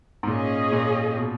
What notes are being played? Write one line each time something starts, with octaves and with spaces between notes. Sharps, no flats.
G#2
A#2 C#4 G#4 D#5
A#2
B2